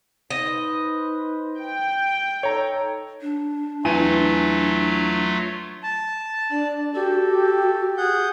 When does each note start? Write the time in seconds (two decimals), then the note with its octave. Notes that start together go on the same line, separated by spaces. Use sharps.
0.30 D#4 B4 C5 D#5
1.61 G5
2.43 D#4 A4 C#5 A#5
3.22 D4
3.84 E2 F#3 A3 F4 G#5 D#7
5.83 A5
6.51 D4 D5
6.95 F#4 G4 A4
7.97 G#4 F#5 G6